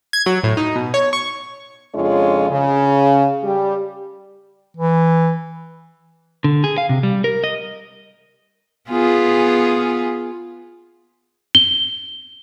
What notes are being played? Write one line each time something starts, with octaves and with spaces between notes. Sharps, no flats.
G#6
F#3
A2
D#4
B2
C#5
C#6
F2 C#3 G#3 D4 F4 C#5
C#3
G3 G4
E3
D3
G#4
F5
C3
G3
A#4
D#5
B3 F4 G#4
G7